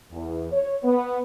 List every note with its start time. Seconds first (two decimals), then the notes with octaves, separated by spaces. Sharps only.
0.11 E2
0.52 C#5
0.84 B3